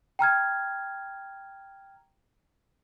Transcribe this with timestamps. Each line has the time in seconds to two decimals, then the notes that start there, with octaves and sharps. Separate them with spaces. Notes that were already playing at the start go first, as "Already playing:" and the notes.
0.19 G5 A#5 F6 G#6